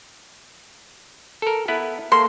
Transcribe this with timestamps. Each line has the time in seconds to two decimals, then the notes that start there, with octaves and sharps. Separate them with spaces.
1.42 A4 A#4
1.68 B3 E4 B4
2.12 A#3 A4 C6